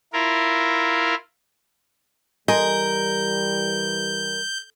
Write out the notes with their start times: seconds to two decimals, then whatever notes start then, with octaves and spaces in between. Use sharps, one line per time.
0.13 E4 F4 A#4
2.48 E3 G3 A#4 D#5 G#5 C6 G6